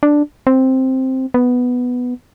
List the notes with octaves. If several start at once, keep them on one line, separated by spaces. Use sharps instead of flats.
D4
C4
B3